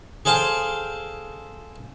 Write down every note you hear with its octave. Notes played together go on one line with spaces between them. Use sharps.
G#4 A4 C5 F5 G5 A5